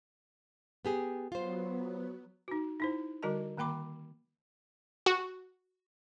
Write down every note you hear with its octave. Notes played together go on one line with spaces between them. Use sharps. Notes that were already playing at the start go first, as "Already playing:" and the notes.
B3 G4 G#4
F#3 B3 F4 C5
D#4 F#4
D#4 E4 C5
D3 G3 F#4 A#4 D#5 A5
D#3 A#3 G5 B5 D6
F#4